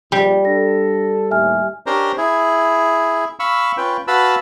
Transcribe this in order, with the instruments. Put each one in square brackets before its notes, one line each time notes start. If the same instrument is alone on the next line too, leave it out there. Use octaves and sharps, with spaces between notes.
[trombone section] A#1 [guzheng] G3
[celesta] D4 A#6 [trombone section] A4
[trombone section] D#2 A2 [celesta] E5 G#5 F6
[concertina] C#4 D4 G4 A#4 C5 A#5
E4 G#4
F5 B5 C#6 E6
C#4 F4 B4 G5
F#4 B4 F5 A5 B5 E6